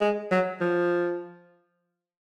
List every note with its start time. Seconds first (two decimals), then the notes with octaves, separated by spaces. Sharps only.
0.01 G#3
0.31 F#3
0.61 F3